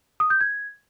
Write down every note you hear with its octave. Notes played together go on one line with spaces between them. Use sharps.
D#6
G6
G#6